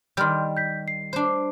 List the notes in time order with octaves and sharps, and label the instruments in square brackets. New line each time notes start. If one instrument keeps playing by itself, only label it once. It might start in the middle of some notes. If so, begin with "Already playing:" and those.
[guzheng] D#3 G3 [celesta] C6 F6 G6
[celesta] G6 B6
C7
[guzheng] D4 C5